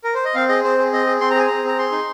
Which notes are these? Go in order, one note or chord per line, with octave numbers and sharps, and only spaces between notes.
A#4
C5
D#5
C4 F5
G#4 D#5
C4 C5
G#4
C4 D#5
G#4
C4 C6
A#5
G#4 G#5
C4 A#5
C4 A#5
G#4 C6
D#4